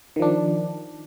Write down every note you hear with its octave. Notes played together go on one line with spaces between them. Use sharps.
D#3 F3 D4